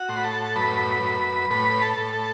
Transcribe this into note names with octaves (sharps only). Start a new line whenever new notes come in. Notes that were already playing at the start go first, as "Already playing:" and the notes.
Already playing: F#4 F#5
A2 C6
B5
A4 A5
F#2 B4 B5
F#2
A2 B4 B5
A4 A5
A2
A4 A5